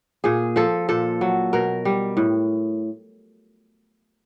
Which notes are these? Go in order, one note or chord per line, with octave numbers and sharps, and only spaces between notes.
A#2 G#4
F3 A4
A#2 A4
F#3
B2 A#4
G3
A2